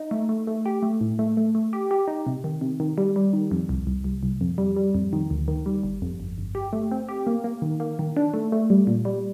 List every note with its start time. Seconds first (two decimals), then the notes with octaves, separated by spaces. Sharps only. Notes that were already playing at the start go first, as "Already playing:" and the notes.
Already playing: D#4
0.11 A3
0.29 A3
0.47 A3
0.66 G4
0.82 A3
1.01 A2
1.19 A3
1.37 A3
1.55 A3
1.73 G4
1.91 G4
2.08 D#4
2.27 C3
2.44 D#3
2.61 C3
2.80 D#3
2.98 G3
3.16 G3
3.33 D#3
3.51 F2
3.69 C2
3.87 C2
4.04 C2
4.23 C2
4.41 F2
4.58 G3
4.76 G3
4.94 F2
5.13 D#3
5.30 D2
5.48 D#3
5.66 G3
5.83 G1
6.02 F2
6.20 G1
6.38 G1
6.55 G4
6.73 A3
6.91 C4
7.09 G4
7.27 A#3
7.44 A#3
7.62 D#3
7.80 A#3
7.99 D#3
8.17 D4
8.34 A3
8.52 A3
8.70 G3
8.87 A#2
9.05 G3